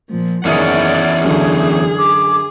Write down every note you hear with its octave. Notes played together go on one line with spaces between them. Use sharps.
A#2 F3
F#1 E2 D#3 C#4 D5 E5 F#5 D#6
F#2 D3 G#4
D6